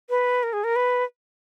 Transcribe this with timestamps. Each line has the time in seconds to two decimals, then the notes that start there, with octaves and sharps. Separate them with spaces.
0.10 B4
0.43 A#4
0.53 G#4
0.64 A#4
0.76 B4